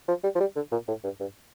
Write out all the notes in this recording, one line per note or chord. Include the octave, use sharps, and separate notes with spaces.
F3
G3
F3
G3
D3
A#2
A2
G2
G2